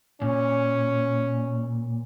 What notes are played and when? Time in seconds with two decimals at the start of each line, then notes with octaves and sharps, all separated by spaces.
0.22 A#2 C#4